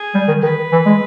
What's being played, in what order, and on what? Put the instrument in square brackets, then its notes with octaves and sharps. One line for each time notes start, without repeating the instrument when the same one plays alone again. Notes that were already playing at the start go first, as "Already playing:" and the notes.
Already playing: [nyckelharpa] G#4
[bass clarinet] G3
D#3
[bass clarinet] D#3 [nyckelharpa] B4
[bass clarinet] E3
G#3